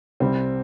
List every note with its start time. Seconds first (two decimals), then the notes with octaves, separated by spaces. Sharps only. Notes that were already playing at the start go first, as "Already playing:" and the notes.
0.20 C2 C3 G3 C4